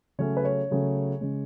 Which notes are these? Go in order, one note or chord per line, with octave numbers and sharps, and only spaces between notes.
C#3 F#3 A3 C#4 C#5
B4
C#5
C#3 F#3 A3 C#4
C#3 G#3 C#4